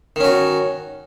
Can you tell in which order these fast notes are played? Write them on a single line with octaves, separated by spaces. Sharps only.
D#3 C#4 F#4